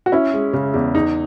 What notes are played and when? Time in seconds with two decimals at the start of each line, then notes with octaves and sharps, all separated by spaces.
0.06 F#4
0.12 C#4 E4
0.34 G#3
0.53 C#3
0.74 E2
0.94 E2 D#4